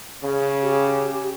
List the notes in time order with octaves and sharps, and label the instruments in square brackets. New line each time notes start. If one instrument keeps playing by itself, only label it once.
[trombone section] C#3
[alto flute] G4